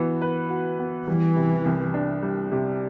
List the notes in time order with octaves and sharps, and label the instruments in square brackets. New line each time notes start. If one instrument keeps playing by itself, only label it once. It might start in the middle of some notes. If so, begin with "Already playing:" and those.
Already playing: [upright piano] E3 B3 F#4
B4
F#4
B3
[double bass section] E3 [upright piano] G3
[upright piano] C3
C2
D4
G3
C3